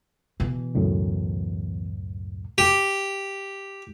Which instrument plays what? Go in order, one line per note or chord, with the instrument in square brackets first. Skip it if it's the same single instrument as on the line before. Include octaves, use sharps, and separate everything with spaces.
[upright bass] B2 E3
[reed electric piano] C#2 F#2 A2
[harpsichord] G4